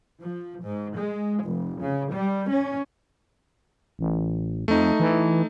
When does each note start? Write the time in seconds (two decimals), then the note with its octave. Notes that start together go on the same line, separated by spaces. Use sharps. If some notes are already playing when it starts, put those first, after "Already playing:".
0.19 F3
0.62 G#2
0.96 G#3
1.43 F1
1.80 C#3
2.11 G3
2.49 C#4
3.99 A1
4.68 F2 A3 D#4
5.00 E3